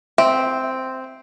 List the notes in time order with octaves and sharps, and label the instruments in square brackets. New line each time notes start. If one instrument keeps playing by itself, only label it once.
[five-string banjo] C4 [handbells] E5